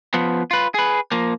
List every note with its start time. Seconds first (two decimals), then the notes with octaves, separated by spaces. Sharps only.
0.14 F3 B3
0.51 F4 B4
0.74 G#4 B4
1.12 F3 A#3